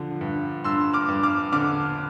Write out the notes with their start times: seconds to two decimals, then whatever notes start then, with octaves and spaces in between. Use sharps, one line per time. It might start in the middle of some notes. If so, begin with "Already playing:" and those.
Already playing: D3 F3
0.21 G2
0.64 G2 C6 E6
0.94 D6 F6
1.08 G2
1.23 D6 F6
1.53 D3 D6 F6